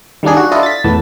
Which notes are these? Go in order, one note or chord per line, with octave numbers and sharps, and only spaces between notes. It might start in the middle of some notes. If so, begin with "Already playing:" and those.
D#3 G3 A#3 D4 G#4
F#4
D4 E4 F4 A4 D#5
A6 B6
E2 A2 B3 A5